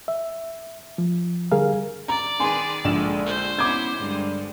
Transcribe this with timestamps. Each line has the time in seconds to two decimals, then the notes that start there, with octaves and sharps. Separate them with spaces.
0.08 E5
0.98 F3
1.52 D3 G3 G#4 A#4 F5
2.08 D5 A#5
2.40 D#3 G#4 B4 G#5 C6
2.84 A#1 D3 G#3 E7
3.26 C5
3.59 B3 C#4 E4 D6 G#6
3.97 G2 D3 G#3